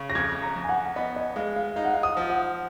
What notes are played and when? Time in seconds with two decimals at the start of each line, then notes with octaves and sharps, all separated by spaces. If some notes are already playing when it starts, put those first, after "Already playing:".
Already playing: C#3
0.10 A#6
0.15 F2 G#6
0.42 A#5
0.56 F2
0.64 G#5
0.69 F#5
0.96 B3 D#5
1.16 D#5
1.36 G#3 F5
1.56 F5
1.76 D#4 F5
1.85 F#5
1.94 F5
2.03 D#6
2.17 F3
2.30 F#5